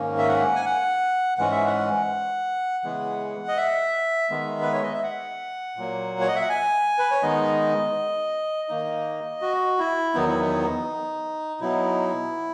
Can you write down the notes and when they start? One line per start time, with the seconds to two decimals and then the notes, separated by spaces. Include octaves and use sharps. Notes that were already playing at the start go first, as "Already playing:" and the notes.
Already playing: G#2 D#3 A#3 C#4
0.18 E5
0.28 F#5
0.55 G#5
0.65 F#5
1.38 G#2 E3 G#3 C#4 F#5
1.51 E5
1.66 F#5
2.84 C#3 E3 G#3 B3
3.48 D#5
3.57 E5
4.30 D#3 G#3 B3
4.62 B4
4.73 C#5
4.83 D#5
4.93 E5
5.04 F#5
5.76 A#2 F#3 A#3
6.21 C#5
6.28 D#5
6.36 E5
6.42 F#5
6.49 G#5
6.98 B4
7.11 C#5
7.23 D#3 G#3 B3 D#4 D#5
8.69 D#3 A#3 D#4
9.42 F#4
9.79 E4
10.14 E2 D#3 F#3 B3 D#4
10.28 E4
10.41 D#4
11.61 B2 F#3 B3 D#4 E4